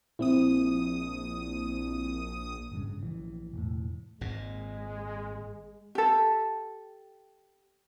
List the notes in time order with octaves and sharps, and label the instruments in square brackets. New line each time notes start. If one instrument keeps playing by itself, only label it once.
[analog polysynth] A#1 D#6 [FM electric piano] C4 E4
[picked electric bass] G#1 G2 C#3
A#1 E3
E1 A2
[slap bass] G#1 A#2 [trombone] G#3
[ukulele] G4 A4